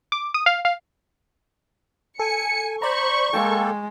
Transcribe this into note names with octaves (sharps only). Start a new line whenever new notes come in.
D6
D#6
F5
F5
A4 G#5 C#7
C5 D5 A#5 B5 C#6
G#3 A#3 A4 G5